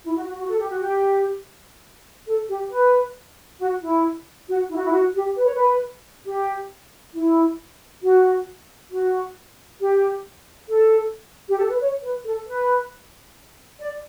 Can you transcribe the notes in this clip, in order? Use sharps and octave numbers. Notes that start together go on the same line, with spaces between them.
E4
F#4
F#4
F#4
A4
G4
F#4
G4
A4
G4
B4
F#4
E4
F#4
E4
F#4
E4
F#4
G4
B4
C#5
B4
G4
E4
F#4
F#4
G4
A4
G4
A4
B4
C#5
B4
A4
B4
D5